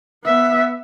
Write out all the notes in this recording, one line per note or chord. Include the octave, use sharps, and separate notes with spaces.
B3 E5